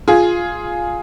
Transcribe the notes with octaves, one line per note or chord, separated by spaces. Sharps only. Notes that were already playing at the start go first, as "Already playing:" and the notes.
F4 G#4